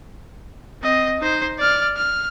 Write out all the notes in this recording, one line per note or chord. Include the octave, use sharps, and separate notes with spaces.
C4 D#5
D#4 C5
D5 F6
F6